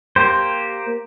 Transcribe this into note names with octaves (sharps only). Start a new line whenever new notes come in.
A#3 G4 C5